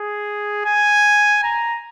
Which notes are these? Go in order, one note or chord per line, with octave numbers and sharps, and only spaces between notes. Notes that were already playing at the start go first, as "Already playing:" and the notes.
Already playing: G#4
G#5
A#5